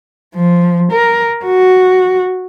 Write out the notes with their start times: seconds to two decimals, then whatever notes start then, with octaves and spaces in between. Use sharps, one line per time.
0.35 F3
0.92 A#4
1.44 F#4